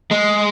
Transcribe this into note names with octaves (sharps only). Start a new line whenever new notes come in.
G#3